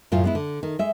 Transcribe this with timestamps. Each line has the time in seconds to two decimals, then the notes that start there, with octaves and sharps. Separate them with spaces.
0.12 F#2 A2 C#3 F4
0.24 G#3 B3 E4
0.35 D3
0.63 D#3
0.79 G#3 E5